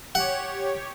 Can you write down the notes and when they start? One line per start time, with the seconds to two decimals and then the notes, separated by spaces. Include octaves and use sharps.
0.15 G4 C#5 F#5